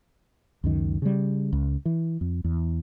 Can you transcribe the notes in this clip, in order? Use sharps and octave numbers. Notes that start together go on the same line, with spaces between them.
C#2 F#2 D#3
C#3 G3
C#2
E3
F2
E2